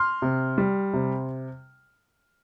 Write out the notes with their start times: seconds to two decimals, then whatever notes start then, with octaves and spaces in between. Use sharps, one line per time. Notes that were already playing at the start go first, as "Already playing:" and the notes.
Already playing: C6 F6
0.22 C3
0.58 G3
0.93 C3